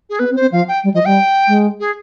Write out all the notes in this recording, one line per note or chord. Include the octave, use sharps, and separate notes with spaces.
G#4
B3 B4
C4
C5
C4
F3 F5
G5
G3
F3 D#5
G3 G5
G#3
G#4